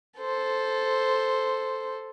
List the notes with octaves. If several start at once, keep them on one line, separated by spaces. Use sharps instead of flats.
A4 C5